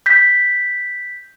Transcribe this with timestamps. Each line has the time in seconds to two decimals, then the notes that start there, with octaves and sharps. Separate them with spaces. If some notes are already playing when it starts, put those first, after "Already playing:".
0.06 G6 B6